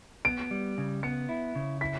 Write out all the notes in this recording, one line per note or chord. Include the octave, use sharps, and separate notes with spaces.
B3 D7
G3
C#3
B3 C#7
E4
C#3
E4 B6